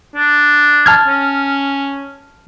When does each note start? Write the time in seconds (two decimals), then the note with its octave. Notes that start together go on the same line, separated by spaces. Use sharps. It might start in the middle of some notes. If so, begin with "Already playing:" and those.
0.16 D4
0.86 A5 F6 G#6
1.06 C#4